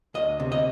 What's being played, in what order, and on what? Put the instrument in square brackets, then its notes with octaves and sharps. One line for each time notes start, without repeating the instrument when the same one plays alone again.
[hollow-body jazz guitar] D2 D#5
C3
D#5